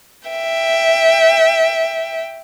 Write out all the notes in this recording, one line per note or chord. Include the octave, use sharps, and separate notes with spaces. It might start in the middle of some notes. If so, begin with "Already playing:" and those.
E5 G5